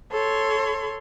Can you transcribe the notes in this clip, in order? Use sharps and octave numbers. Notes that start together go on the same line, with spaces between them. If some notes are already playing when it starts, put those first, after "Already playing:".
A4 C#5 C6